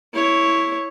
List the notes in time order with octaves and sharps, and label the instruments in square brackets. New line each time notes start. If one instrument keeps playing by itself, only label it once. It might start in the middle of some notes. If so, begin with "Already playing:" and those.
[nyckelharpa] E4 C#5